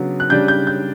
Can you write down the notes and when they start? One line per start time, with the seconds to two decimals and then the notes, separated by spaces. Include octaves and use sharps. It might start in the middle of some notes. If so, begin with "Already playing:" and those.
Already playing: C#3 F#3 B3 D4
0.20 F#6
0.30 C#3 G3 D4 G6
0.48 G6
0.67 G6